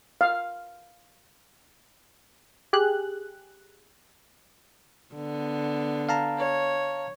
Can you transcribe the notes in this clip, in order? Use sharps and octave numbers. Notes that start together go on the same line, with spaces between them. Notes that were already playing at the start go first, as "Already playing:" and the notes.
F5
G4 G#4 F#6
D3 B3
F5 A5 A#5
C#5